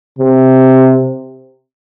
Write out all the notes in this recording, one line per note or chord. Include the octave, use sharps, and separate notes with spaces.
C3